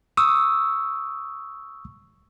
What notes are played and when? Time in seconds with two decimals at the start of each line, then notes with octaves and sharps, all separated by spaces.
0.17 C#6 D#6 E6